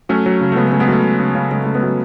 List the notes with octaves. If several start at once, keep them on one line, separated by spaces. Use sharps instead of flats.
F#3 A3 C#4
F#3
C#3
A3
C#3 G#3 B3
C#3 A3
G#3 B3
F#3 A3
C#3
C#3
C#3
C#3 G#3
C#3 A3
G#3 B3
F#3 A3